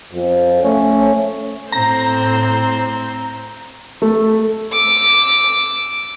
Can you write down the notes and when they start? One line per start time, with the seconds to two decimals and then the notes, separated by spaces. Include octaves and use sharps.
0.13 F2
0.62 A3 C#4
1.72 A2 C4 C5 A#5
4.02 A3
4.71 D6 E6